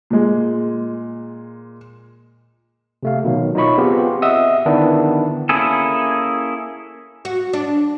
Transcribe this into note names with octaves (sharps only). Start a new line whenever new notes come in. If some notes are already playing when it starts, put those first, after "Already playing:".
A#2 G#3
C3 A3 F5
B2 D#3 F#3
D#4 F4 C#5 D#5 B5 C#6
B3 C4 F4 G4 G#4
D#5 E5 F#5 D#6 E6
D3 D#3 B3 D4 E4
A#3 C#4 E4 G#4 A4
F#4
D4